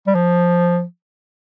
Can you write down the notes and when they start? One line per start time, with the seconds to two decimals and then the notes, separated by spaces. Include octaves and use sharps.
0.07 G3
0.15 F3